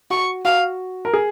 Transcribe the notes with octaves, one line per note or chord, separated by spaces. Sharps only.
F#4 C#6
F#4 F5
A#4
G#4